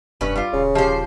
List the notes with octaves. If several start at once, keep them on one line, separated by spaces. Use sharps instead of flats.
F1 G2 C#4 B4
G3 F4
D#1 C#3
F3 G4 C5